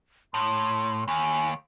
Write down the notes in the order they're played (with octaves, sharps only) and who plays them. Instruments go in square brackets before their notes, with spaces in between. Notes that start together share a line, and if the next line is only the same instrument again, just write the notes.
[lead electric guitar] A2 [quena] C6
[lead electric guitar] D#2 [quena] G#5